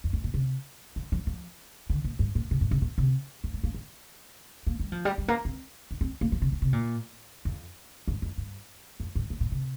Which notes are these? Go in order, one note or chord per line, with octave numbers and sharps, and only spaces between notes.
F2
G2
A#2
C3
F3
F3
F3
D3
A#2
G2
A#2
C3
G2
C3
A#2
C3
F3
G3
A#3
F3
A#3
G3
F3
G3
G3
A#3
C4
D4
C4
A#3
F3
C3
A#2
C3
A#2
F2
G2
F2
G2
F2
G2
A#2
A#2
C3